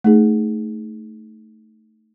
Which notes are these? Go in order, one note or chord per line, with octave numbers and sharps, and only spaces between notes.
A3 D#4 G#4